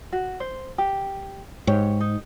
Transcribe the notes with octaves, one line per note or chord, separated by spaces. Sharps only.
F#4
C5
G4
G#2 G4 C#5
D#4